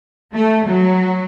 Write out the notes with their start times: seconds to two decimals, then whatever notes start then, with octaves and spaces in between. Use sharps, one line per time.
0.34 A3
0.67 F#3